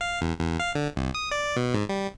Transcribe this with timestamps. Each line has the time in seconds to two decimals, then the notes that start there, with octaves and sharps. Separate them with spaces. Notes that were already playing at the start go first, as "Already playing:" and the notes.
0.01 F5
0.21 E2
0.39 E2
0.60 F5
0.75 D3
0.96 C2
1.15 D#6
1.31 D5
1.56 B2
1.74 G#2
1.89 G3